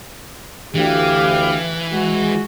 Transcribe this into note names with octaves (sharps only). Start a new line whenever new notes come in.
D2 E3 G4 F5
G#3 F#4